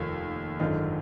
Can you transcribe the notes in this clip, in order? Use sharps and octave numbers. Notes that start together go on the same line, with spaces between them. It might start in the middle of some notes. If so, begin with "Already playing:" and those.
Already playing: F1 D#2 D#4 F4
G#1 F#2 D3 D#4 F4